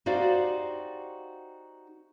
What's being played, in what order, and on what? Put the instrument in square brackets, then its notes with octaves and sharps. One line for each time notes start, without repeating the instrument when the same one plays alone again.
[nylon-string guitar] D#4 F#4 G4 C5 D5 F5